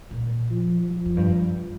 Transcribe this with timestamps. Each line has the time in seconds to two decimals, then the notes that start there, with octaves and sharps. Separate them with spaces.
0.11 A#2
0.51 F3
0.91 F3
1.05 F2
1.17 G2